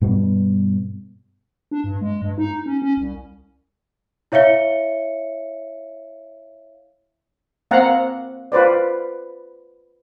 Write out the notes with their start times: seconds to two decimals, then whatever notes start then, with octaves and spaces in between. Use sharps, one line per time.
0.01 G2 B2 G3 B3
1.71 D4
1.84 G2
2.01 G#3
2.22 G2
2.38 D#4
2.66 C#4
2.82 C#4
2.97 C2
4.32 E4 C#5 E5 F5 C#7 G7
7.71 A#3 C4 F5 F#5 A#5
8.52 F4 B4 C5 D5